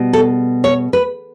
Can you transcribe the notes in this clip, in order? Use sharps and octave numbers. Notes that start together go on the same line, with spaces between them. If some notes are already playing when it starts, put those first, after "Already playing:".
Already playing: B2 G3
A4
C#5
B4